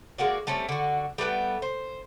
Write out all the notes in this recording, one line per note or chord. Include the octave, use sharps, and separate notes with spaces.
G#3 A#3 F#4 D5
G3 A3 C4 C#4
D3 F#4
G3 A3 B3 G5
C5